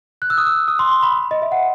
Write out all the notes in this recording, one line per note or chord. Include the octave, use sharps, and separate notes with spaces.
F#6
E6
D#6
E6
D#6
C6
C6
B5
D#5
E5
F#5